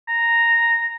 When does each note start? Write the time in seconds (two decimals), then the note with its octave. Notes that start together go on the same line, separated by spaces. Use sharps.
0.08 A#5